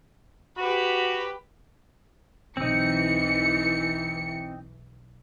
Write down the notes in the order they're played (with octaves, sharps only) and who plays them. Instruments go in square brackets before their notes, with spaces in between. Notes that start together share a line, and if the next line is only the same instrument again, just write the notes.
[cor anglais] F#4 [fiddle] G4 B4
[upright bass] B1 [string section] E3 C#7 [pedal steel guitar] C4 D#4